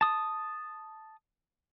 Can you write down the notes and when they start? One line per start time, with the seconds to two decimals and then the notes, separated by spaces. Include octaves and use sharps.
0.01 A5 D#6